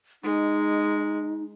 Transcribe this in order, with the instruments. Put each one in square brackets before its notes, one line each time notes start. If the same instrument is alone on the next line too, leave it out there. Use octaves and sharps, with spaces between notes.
[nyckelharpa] G#3 [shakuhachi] D#4